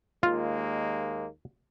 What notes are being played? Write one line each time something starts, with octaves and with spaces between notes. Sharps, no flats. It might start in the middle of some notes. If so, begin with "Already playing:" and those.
D#2 G#3 A#3 F4